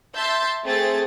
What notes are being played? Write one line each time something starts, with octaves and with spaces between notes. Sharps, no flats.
E5 A5 C6 E6 G6 A6
A3 C4 G#4 A6